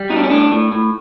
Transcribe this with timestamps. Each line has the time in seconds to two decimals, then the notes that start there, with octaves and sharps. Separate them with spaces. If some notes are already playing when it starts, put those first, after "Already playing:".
Already playing: G3
0.10 B2 D#4
0.16 D4
0.23 C#4
0.30 A2 D4
0.52 A2
0.72 A2